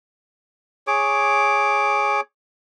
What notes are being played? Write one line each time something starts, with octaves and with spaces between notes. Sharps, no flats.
G#4 C#5 D6